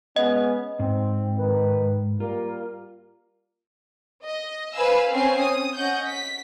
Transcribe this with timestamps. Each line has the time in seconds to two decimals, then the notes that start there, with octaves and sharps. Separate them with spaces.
0.16 G#3 B3 C#4 D#5
0.79 G#2 C4
1.38 D#3 B4
2.20 G3 A#3 F4 A#4
4.24 D#5
4.74 B4 C5 F5 G#5 B5 E6
5.11 C4 C#4 G#5 C7
5.39 D#6
5.76 C#4 D#5 F#5 G6
6.07 B6